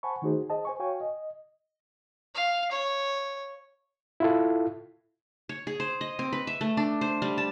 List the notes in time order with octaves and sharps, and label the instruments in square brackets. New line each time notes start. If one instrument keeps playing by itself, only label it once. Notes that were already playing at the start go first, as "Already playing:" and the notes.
[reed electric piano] C5 F#5 G#5 A5 B5 C#6
D#3 A3 D#4 F#4 G#4 C5
G#4 C5 D#5 A5
C5 G#5 C#6
F#4 C#5 F5 G5 G#5 C#6
D#5
[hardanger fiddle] F5
C#5
[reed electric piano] E4 F4 A4
[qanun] C#5
G#4
C5
D#5
C4
B4
E5
A3
D4
C5
G3
A5